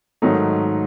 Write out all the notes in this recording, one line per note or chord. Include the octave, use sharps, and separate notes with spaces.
G#2 D#3 F#3 A3 D#4